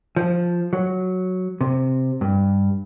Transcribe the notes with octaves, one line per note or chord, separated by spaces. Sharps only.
F3
F#3
C3
G2